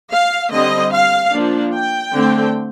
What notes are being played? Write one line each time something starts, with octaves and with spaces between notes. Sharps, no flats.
F5
D3 G3 C4 D#5
F5
F3 A#3 D4
G5
D3 A3 C4